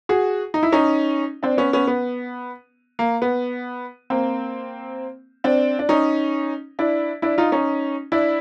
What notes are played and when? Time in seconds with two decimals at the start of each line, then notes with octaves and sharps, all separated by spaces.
0.09 F#4 G#4
0.54 D#4
0.63 E4
0.72 C#4 D#4
1.43 C4 D4
1.57 B3 C#4
1.73 B3 C#4
1.87 B3
2.99 A#3
3.22 B3
4.10 A#3 C4
5.44 C4 D4
5.79 D4
5.89 C#4 D#4
6.79 D4 E4
7.22 D4 E4
7.38 D#4 F4
7.52 C#4 D#4
8.12 D4 E4